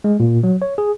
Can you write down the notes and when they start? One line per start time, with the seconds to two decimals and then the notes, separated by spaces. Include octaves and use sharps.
0.04 G#3
0.20 A#2
0.43 F#3
0.62 C#5
0.78 G#4